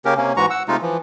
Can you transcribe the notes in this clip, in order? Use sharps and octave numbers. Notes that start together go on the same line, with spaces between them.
C#3 A#3 C#4 G4 A#4
C3 A#3 C#4
G#2 E3 G#3 F#4 A#5 C#6
F#5 E6
C3 G#3 A3 D#4 F4
E3 F3